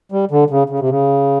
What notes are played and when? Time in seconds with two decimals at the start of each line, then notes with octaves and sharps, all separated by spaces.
0.12 G3
0.31 D3
0.50 C#3
0.70 C#3
0.80 C3
0.90 C#3